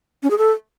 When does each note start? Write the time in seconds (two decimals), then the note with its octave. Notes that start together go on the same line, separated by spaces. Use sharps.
0.23 C#4
0.31 G#4
0.38 A4